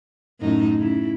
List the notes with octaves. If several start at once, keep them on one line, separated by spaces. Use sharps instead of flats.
F#2 A2 D#4
C#3 E4